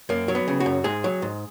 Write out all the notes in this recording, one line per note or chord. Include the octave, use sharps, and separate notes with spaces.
F#2 A#3
F#3
B3
C#3
F#4
F#2
G#2 G#4
F#3
G#2